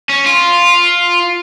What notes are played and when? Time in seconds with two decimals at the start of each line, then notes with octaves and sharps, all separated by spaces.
0.09 C#4
0.26 F4